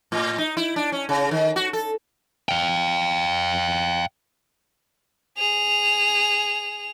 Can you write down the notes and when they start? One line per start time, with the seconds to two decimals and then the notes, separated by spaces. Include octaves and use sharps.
0.12 A2
0.38 D#4
0.57 E4
0.76 D4
0.92 C#4
1.09 C#3
1.31 D#3
1.56 F#4
1.73 A4
2.49 F5 G5
5.37 G#4 F7